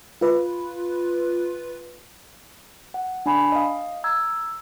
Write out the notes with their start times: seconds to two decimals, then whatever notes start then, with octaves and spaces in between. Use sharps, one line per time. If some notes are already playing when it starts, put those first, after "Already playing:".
0.21 F4 B4
2.94 F#5
3.26 D4 G#5 B5
3.52 D#5 F5
4.04 A#5 E6 G#6